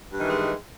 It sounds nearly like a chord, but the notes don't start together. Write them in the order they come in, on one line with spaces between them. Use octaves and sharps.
G2 D#3 E3 G#3